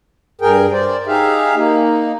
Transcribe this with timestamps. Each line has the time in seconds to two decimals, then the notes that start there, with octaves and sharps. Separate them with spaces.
0.41 G2 G#4 A#4 G5
0.72 C5 D5
1.07 D#4 G4 G#4 E5 F5
1.55 A#3 D#4